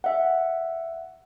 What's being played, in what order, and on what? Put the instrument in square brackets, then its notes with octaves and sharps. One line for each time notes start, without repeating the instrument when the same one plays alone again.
[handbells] E5 F#5